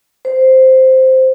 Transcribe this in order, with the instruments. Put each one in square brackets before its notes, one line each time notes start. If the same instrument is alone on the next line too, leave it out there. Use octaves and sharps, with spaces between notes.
[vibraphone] C5